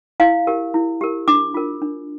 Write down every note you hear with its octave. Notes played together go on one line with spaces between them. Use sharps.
E4 F5
G4 A#4
E4
G4 A#4
D4 D6
F4 A#4
D4